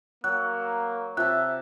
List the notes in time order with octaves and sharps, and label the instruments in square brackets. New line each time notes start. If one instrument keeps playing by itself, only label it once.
[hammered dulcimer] F#3 [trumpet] A#3 [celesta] F#6
[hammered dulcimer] C3 A5 [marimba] F4 [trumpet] E5 [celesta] F#6